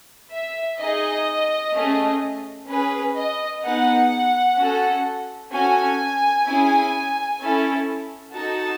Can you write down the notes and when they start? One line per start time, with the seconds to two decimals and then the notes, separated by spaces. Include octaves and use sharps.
0.33 E5
0.80 D#4 G#4 D#5
1.75 A3 C#4 G#4
2.69 C#4 G#4 B4
3.16 D#5
3.63 B3 D#4 G#4 F#5
4.58 C#4 F#4 A4
5.52 C#4 F#4 A4 G#5
6.46 C#4 E4 G#4
7.41 C#4 E4 A4
8.35 D#4 F#4 A4 A5